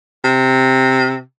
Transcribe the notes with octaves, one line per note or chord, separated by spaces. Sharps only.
C3